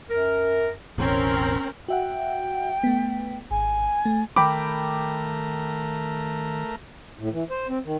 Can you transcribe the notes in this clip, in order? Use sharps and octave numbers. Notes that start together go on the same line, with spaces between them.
F#2 A#4
E1 A1 C4 C#4 A#4
F#4 E5 F#5 G5
A3 B3
G#1 G#5
A3
D#3 A3 A#4 G5 B5 D6
A2
E3
C5
C4
D#3